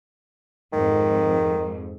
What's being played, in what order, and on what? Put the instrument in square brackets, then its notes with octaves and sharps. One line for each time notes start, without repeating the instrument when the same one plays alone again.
[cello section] F2 G#2 [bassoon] D#3